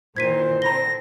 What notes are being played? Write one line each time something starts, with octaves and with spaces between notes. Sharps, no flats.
A#2 D#3 E3 C5 G#6 B6 D#7
D3 C4 A#5 B5 A#6 G7